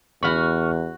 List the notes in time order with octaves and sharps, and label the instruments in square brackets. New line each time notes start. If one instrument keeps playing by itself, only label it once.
[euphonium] E2 [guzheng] F#4 B5 [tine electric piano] C#6 F6